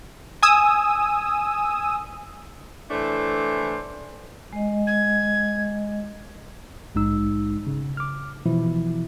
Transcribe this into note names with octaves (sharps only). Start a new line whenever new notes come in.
G#5 D#6 E6
A2 E3 A3 D4 C5
G#3 D#5
G#6
A#1 G#2 G#3 D#4 E6
C#3
D6 F6
B2 E3 F3 E4